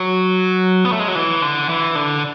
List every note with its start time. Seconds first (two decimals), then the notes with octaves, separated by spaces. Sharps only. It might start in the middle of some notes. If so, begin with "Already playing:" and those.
Already playing: F#3
0.85 B3
0.92 A3
1.00 G#3
1.08 F#3
1.15 E3
1.42 D3
1.69 E3
1.95 D3